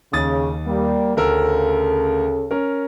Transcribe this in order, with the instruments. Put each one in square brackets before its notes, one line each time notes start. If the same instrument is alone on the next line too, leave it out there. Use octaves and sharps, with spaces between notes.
[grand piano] D#2 D#6 A6 [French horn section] C#3
[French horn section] G3 A#3
[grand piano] D2 A#4 E6 [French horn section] C#3 A4
[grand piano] C#4 A#4